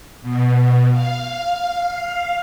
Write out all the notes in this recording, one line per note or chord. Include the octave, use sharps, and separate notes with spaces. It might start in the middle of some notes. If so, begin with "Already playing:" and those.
B2
F5